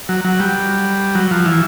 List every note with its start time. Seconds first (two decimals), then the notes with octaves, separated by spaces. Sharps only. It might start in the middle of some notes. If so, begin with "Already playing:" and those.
0.09 F#3
0.25 F#3
0.40 G3
1.15 F#3
1.31 F3
1.46 E3